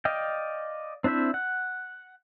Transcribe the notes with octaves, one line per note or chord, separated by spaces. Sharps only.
D5 D#5 F5 G5
C4 D4 E4 C5 E5
F#5